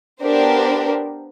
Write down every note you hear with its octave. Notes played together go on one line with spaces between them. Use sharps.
B3 D4 G4 A#4 C5